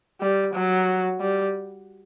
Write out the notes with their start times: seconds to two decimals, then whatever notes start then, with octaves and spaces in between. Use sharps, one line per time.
0.21 G3
0.54 F#3
1.21 G3